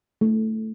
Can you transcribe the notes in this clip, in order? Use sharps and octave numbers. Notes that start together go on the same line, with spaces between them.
A3